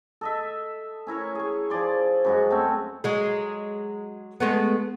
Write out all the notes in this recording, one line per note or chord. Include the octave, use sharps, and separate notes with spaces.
A4 D#5 E5
C#4 E4 A#4 C#5
G#4 C#6
F3 G#4 D5 C6
F#2 G#3 F#4
A3 C4 C#4 C#6
F#3 G#3 G#4
G#3 A3 B3